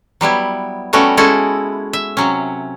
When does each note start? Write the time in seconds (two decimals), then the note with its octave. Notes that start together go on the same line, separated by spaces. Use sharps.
0.21 F#3 G3 B3 E4
0.93 G3 A3 B3 C#4 F#4
1.17 G#3 C#4 E4 F#4 A4
1.93 E5
2.17 C3 F#3 C#4